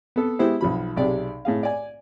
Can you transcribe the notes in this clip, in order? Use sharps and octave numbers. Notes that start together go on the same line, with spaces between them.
B3 A4
G#3 B3 E4 G4 C5
B1 F3 B5
B1 C3 G4 G#4 D5
A2 G#4 F5
D5 G#5